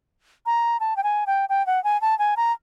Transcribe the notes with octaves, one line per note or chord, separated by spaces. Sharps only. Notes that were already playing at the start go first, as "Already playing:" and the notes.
A#5
A5
G5
G#5
G5
G5
F#5
G#5
A5
G#5
A#5